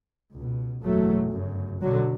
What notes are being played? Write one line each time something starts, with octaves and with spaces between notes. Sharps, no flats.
C#2 B2
F#1 E2 B2 F#3 A3
G1 F#2 C#3
B1 B2 D3 F#3